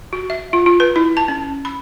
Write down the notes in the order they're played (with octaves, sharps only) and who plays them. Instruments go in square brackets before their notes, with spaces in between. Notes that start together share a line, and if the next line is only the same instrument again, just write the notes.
[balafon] F#4
E5
F4
F4
B4
E4
A5
C#4
B5